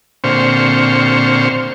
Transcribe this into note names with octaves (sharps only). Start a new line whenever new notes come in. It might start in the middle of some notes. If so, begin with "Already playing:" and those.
A#2 D3 C4 C5 C#6 F6